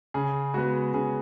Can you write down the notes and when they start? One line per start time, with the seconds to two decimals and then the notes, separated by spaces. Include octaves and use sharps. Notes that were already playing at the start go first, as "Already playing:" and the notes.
0.14 C#3 G#4
0.54 G#3 B3 F#4
0.94 C#3 G#4